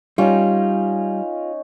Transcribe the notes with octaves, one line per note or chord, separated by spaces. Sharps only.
G3 C#4 D#4 F4